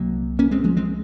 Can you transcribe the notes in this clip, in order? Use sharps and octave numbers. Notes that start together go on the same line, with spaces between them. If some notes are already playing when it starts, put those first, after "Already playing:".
Already playing: C2 C3 F#3 A#3
A#3 C#4
G#3 C4
F3 G#3
G#3 C4